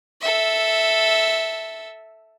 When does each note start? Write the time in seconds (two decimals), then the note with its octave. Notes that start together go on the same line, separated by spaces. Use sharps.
0.21 A4 E5